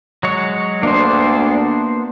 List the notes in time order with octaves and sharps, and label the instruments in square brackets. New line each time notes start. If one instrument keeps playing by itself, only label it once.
[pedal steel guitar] F#3 G#3 C#5
[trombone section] D2 D4 [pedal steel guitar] A#3 B3 C5